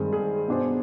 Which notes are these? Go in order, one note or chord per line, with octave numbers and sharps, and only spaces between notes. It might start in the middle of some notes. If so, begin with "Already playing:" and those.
Already playing: G2 D#3 G#3 C4 G#4
G#4
B2 B3 D4 G#4 C5